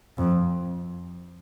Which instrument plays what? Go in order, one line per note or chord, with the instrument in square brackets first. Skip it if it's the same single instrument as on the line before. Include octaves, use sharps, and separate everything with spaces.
[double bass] F2